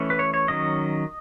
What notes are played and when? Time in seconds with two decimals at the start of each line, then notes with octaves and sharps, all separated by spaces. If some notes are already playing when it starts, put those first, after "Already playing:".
Already playing: E3 A3 C#4
0.10 B4
0.19 C#5
0.34 C#5
0.48 D#3 F#3 C#4 D#5